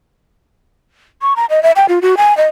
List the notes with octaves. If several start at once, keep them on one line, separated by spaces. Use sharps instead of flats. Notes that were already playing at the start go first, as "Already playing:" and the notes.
C#6
A#5
D#5
E5
G5
F4
F#4
G#5
D#5